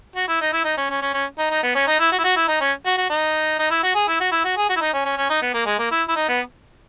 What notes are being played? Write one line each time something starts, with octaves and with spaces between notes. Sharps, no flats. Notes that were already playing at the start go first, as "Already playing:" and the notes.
F#4
E4
D#4
E4
D#4
C#4
C#4
C#4
C#4
D#4
D#4
B3
C#4
D#4
E4
F#4
E4
F#4
E4
D#4
C#4
F#4
F#4
D#4
D#4
E4
F#4
G#4
E4
F#4
E4
F#4
G#4
F#4
E4
D#4
C#4
C#4
C#4
D#4
B3
A#3
G#3
A#3
E4
E4
D#4
B3